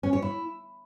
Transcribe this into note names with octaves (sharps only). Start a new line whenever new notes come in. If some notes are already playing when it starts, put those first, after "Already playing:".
C#4
C#5
E4